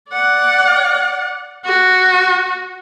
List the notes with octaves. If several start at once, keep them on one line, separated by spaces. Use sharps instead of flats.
D5 F#5
F#4